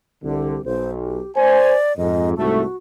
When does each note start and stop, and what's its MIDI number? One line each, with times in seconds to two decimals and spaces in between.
0.24 0.58 36
0.24 0.58 50
0.24 0.62 67
0.65 1.20 35
0.65 0.90 72
1.02 1.34 67
1.36 1.75 72
1.36 1.96 74
1.36 1.75 80
1.98 2.37 41
1.98 2.37 44
1.98 2.29 75
2.38 2.63 36
2.38 2.63 44
2.38 2.63 57
2.38 2.77 66